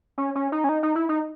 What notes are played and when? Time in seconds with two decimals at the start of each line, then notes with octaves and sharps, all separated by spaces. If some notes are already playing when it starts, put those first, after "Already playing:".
0.18 C#4
0.35 C#4
0.52 D#4
0.64 C#4
0.69 D#4
0.83 D#4
0.95 E4
1.09 D#4